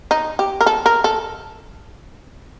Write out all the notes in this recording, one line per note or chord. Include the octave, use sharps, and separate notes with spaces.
D#4
G4
A#4
A4
A#4
A4